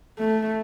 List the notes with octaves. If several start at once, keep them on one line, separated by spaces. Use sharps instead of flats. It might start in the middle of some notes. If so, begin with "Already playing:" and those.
A3